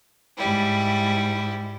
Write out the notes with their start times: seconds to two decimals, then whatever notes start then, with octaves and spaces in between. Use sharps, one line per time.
0.37 G#2 G3 E4